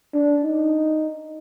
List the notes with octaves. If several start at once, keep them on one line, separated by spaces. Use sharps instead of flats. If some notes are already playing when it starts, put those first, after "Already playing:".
D4
D#4